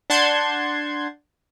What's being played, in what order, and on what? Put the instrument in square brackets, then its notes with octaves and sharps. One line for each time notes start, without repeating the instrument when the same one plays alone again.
[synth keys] D4 F#5 A5 C6 G6 G#6